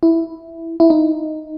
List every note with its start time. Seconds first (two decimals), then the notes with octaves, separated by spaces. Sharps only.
0.03 E4
0.80 E4
0.90 D#4